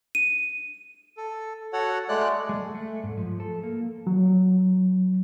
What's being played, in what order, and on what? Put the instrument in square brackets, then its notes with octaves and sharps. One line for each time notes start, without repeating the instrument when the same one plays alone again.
[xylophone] D#7
[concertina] A4
F#4 A4 C#5 F#5
G#3 A3 D5 F#6
[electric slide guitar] G#3
A3
G#2
F3
A4
A#3
[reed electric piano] F#3